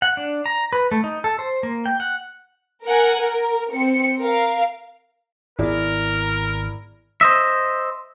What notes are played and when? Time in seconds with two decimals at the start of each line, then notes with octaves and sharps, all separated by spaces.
0.02 F#5
0.17 D4
0.46 A#5
0.73 B4
0.91 A3
1.04 D#4
1.24 A4
1.39 C5
1.63 A#3
1.86 G5
2.00 F#5
2.85 A#4 F#5 G#5
3.19 A#4
3.73 C4 C#7
4.20 A#4 F5
5.59 G#1 B3 E4 G#4 A#4 D5
7.21 C5 D#5 E5